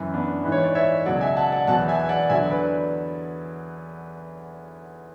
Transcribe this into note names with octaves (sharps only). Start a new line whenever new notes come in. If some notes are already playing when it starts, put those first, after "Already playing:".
Already playing: F#2 E3
B3 D4
G#2 E3
C#5
D5
C#5 E5
C#2 B2 F#3 D5 F#5
E5 G#5
F#5 A5
D5 F#5
E2 B2 F#3 F#5 A5
E5 G#5
G#5
D5 F#5
E2 D3 F#3 E5 G#5
B4 D5